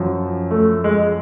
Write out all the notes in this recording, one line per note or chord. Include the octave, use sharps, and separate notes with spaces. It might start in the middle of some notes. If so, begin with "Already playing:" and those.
Already playing: F#2 F3
A3
G#3